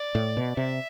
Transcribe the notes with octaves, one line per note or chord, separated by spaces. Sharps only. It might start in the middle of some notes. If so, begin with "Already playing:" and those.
Already playing: D5
A2
B2
C3 E5